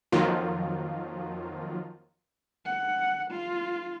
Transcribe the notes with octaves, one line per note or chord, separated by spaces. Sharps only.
F2 D#3 F3 F#3 A#3 F4
F#5
F4